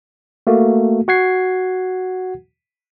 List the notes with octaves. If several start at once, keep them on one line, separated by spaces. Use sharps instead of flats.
A3 A#3 F#4
F#4 F#5 G#6 C7